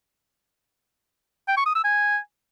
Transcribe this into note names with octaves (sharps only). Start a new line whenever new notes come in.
G5
C#6
D#6
E6
G#5